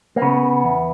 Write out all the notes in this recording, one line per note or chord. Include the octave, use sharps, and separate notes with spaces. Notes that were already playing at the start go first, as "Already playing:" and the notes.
A#3
C#3 B3
E2